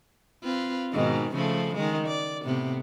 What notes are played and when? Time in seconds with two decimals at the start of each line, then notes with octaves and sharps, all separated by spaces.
0.43 C4 F4 B4
0.93 G#2 B2 D#3
1.33 C#3 F3 A3
1.74 D#3 G#3
2.07 D5
2.44 A2 C3 B3